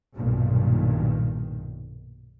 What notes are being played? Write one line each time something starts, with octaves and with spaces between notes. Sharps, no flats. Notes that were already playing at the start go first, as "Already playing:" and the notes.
B1 G2 A#2 D#3